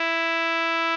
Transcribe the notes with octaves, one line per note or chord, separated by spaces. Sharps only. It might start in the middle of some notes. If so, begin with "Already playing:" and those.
Already playing: E4